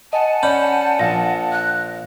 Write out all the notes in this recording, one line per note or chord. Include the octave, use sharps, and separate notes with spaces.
D#5 F#5 G#5 A5
C#4 D5 B5 G6
A#1 F5 A#6
F#6